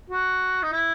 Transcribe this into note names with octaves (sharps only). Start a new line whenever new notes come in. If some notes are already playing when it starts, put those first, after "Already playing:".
F#4
D#4
E4